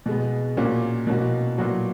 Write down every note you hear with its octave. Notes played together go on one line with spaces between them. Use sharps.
B2 G#3 B3
A#2 A#3 C#4 F#4
B2 A#3 C#4 F#4
A#2 F#3 B3 F#4